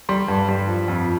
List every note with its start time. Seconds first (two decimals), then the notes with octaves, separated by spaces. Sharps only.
0.09 G3 C6
0.28 G2
0.48 G3
0.68 F3
0.88 F2